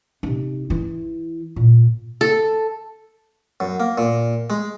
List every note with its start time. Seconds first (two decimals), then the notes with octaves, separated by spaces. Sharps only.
0.23 C3 D#4
0.70 E3 E4
1.56 A#2
2.21 A4
3.60 F#2
3.80 A#3
3.98 A#2
4.50 G#3